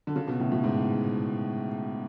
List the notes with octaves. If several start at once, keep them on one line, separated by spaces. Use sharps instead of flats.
D3
C#3
B2
A2
A2
G#2